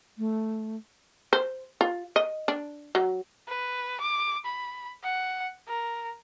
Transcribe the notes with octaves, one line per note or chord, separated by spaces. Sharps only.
A3
C5
F4
D#5
D4
F#3
B4
D6
B5
F#5
A#4